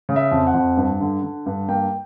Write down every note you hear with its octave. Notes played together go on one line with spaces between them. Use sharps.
C#3
E5
F2
F#5
F2
G2
D3
D3
G2
A#3 G5